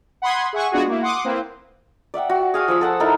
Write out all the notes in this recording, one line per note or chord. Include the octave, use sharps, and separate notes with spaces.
F#5 B5 C6 D#6 G#6
G#4 E5 F#5 G#5 C#6 F#6
G#3 B3 D4 F4 F#4 G#4
A#3 E4
F#5 C6 D6 D#6
A#3 C4 E4 B4 C5
D5 E5 F#5 G5
F#4
G#4 F5 C#6 D#6
F3 C#6 E6
A4 F#5 A5
D#4 E4 A4 A#4